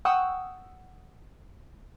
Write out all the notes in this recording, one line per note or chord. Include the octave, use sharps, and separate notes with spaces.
F#5 G5 C#6 D#6 E6